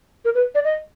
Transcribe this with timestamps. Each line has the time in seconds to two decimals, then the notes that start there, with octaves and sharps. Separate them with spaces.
0.25 A#4
0.35 B4
0.55 D5
0.64 D#5